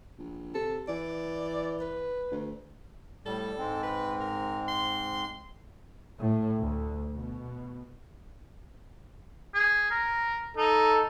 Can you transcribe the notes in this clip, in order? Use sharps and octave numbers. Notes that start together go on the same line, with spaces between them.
A#1
C3 A4
E3 D5
B4
D2
A2 G3 A4
G#2 G#3 C4
B4
A#4
C6
A2
D2
B2
G#4
A#4
D#4 A4